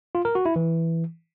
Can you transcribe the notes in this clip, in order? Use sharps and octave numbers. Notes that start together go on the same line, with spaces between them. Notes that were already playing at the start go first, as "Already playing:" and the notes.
F4
A#4
F#4
E4
E3